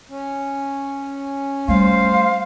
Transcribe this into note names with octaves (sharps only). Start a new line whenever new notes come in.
C#4
G3 A3 C5 F5